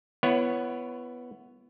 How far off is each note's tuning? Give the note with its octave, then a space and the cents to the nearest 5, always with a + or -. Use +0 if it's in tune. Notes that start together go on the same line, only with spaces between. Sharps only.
B3 +0 E4 +30 C#5 +0